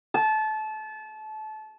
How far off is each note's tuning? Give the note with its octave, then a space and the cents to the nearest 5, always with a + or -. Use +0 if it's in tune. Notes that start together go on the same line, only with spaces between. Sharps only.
A5 -25